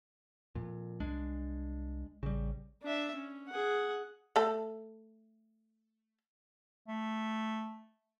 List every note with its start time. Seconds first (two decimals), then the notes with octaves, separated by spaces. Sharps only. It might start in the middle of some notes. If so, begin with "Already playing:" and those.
0.55 F2 A#2
1.00 C2 G#3 D4
2.23 A1 C#3 G3
2.82 D4 E5
3.15 C#4
3.48 G#4 F#5
4.36 A3 A4
6.88 A3